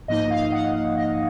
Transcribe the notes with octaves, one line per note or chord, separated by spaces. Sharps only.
G#2 F3 A#3 D#4 D#5
F5
F#5
F#5
D#5